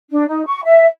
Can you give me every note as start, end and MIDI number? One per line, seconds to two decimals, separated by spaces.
0.11 0.26 62
0.28 0.44 63
0.46 0.61 85
0.64 0.86 76